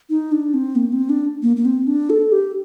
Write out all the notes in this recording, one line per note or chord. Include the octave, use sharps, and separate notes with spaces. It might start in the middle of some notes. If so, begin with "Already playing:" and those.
D#4
D4
C4
A#3
C4
D4
A#3
A#3
C4
D4
A4
G4